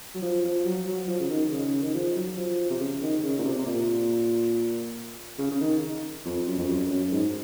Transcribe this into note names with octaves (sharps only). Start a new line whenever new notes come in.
F#3
F3
F3
F#3
F#3
F3
C#3
D#3
C#3
D#3
F3
F#3
F3
C3
C#3
D#3
C#3
A#2
C3
C3
A#2
C#3
C#3
D#3
F2
F#2
F2
F#2
F#2
G#2